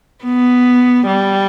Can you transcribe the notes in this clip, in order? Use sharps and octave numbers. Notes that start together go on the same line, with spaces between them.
B3
G3